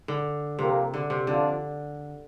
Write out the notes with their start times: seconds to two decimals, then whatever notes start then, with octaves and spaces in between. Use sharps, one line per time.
0.08 D3
0.59 C3 F3 A#3 G4 A#4
0.94 D3
1.10 C3
1.27 F2 D3 F3 D4 F4